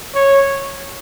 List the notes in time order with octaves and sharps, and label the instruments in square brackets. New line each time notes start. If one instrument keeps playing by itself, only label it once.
[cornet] C#5